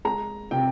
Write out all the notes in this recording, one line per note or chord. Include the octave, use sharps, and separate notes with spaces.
G#3 A#5
C3 G5